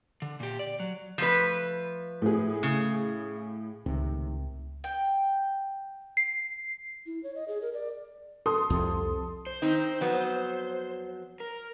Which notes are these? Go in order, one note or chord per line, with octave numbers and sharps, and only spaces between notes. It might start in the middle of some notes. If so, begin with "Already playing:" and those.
D3
A#2 G4
D5
F#3
F3 A3 B4
A2 G#4
C#3
C#2 A2 C3 D#3
G5
C7
E4
C#5
D#5
G#4
A#4
D5
A4 C6 D#6
C2 F2 C3
C5
D#3 C4 D#4
F2 F#3 B3
A#4